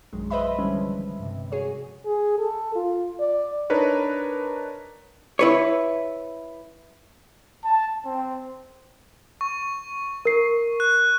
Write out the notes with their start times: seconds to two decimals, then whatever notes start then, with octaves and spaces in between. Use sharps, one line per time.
0.13 A#1 F#2 D#3 F#3 G#3
0.30 B4 C5 D#5 E5 B5
0.58 D3 E3 G3 G#3 C#4
0.77 F3
1.19 G2 C3
1.52 F#4 G#4 C#5
2.06 G#4
2.38 A4
2.75 F4
3.19 D5
3.70 D4 D#4 A#4 B4 C#5
5.39 E4 B4 C#5
7.64 A5
8.05 C4
9.41 C#6
10.25 A#4 C7
10.80 F#6